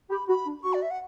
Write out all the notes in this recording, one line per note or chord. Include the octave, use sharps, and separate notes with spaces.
G4 B5
F#4 B5
D4
F#4 C#6
D5
E5
F#5